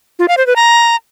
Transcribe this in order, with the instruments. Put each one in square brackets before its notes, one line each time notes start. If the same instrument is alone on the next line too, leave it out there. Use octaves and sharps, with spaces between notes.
[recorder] F4
F5
C5
B4
A#5